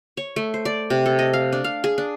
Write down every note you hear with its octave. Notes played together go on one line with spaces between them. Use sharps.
C#5
A3
C5
D5
C3
A4
D#5
F5
D4
F5
G#4
D4